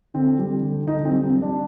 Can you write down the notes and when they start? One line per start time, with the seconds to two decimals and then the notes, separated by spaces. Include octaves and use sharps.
0.14 D3 C4
0.39 G3
0.63 D3
0.87 D3 D#4
1.05 C4
1.11 G3
1.23 C4
1.35 G3
1.42 D4